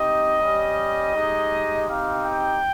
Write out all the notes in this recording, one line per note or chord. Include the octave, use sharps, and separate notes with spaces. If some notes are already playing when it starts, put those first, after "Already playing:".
Already playing: C4 D#4 G4 D#5
G3 C#4 G4
G#3 D#4 G4
C4 D#4 G4 F5
G5